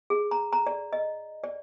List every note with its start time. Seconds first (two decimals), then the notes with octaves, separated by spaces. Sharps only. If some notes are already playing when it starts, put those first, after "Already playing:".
0.10 G#4
0.31 A#5
0.53 A#5
0.67 D5
0.93 D#5
1.44 D5